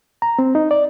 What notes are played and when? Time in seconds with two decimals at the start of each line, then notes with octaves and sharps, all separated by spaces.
0.22 A#5
0.39 C4
0.55 D#4
0.71 D5